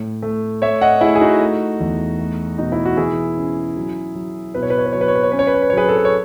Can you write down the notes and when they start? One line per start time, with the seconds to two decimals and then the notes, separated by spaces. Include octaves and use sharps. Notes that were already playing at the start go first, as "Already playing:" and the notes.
Already playing: A2
0.23 A3
0.62 A3 C#5 E5
0.81 D#5 F#5
1.01 A3 E4 G#4
1.15 G#4
1.21 D#4 F#4
1.40 A3
1.80 E2
2.19 A3
2.58 B2 D#4
2.72 E4
2.85 F#4
2.97 E3 E4 G#4
3.38 C#4
3.77 F#3
4.15 F#3
4.55 B2 B4
4.63 C#5
4.70 B4
4.79 C#5
4.86 B4
4.93 F#3 C#5
5.01 B4
5.08 C#5
5.16 B4
5.23 C#5
5.32 C#4 B4
5.39 C#5
5.47 B4
5.54 C#5
5.62 B4
5.70 C#5
5.73 F#3 G#4 B4
5.89 A4
5.97 B4
6.05 C#5